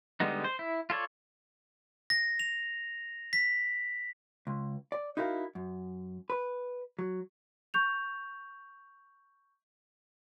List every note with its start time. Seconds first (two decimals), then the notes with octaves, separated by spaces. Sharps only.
0.20 D3 G3 G#3 B3 D#4
0.44 C5
0.59 E4
0.90 F4 A4 C#5 D5
2.10 A#6
2.39 F7
3.33 B6
4.47 C#2
4.92 D5
5.17 D#4 E4 F#4 A#4 E5 F5
5.55 F#2
6.30 B4
6.99 F#3
7.74 C#6 G6 F7